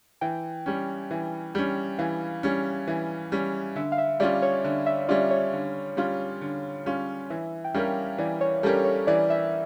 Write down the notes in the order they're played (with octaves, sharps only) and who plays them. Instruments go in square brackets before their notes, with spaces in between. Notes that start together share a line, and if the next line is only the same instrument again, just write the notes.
[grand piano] E3 [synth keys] G5
[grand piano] G3 C#4
E3
G3 C#4
[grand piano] E3 [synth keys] F5
[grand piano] G3 C#4
E3
G3 C#4
[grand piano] D3 [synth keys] E5
[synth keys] F5
E5
[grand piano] G3 C#4 F4 [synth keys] D5
[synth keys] C#5
[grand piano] D3
[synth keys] E5
[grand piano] G3 C#4 F4 [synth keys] D5
[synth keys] C#5
[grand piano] D3
G3 C#4 F4
D3
G3 C#4 F4
[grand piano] E3 [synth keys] E5
[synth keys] G5
[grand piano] G3 C#4 G4 A#4 [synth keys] F5
[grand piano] E3 [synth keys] D5
[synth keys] C#5
[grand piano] G3 C#4 G4 A#4 [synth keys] A4
[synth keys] C#5
[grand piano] E3 [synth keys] D5
[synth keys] E5